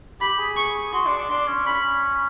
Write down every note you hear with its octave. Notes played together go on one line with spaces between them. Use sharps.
G4 B5
G#4
C#6
F#4 C6
D4
D4
D4 C6
C#4
C#4 B5